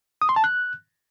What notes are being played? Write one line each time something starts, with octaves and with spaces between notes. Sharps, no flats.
D#6
C6
A5
F#6